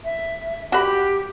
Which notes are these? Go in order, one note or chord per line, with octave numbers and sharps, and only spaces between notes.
E5
F#4 G4 B5